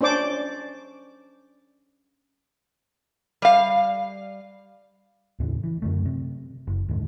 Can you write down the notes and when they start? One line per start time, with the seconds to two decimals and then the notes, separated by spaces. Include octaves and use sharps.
0.01 C#4 D4 C5 D5 D6
3.42 G3 F5
5.40 D#2 A2 C#3
5.63 E3
5.82 F#2 D3 A3
6.05 C3
6.67 F#1
6.88 D#2 G#2 D3